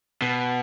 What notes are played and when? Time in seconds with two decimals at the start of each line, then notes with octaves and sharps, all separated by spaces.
0.22 B2